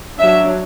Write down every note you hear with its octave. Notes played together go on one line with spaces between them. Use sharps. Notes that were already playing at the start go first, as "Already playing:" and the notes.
F#3 D4 E5